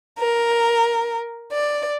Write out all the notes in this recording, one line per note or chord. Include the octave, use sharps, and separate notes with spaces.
A#4
D5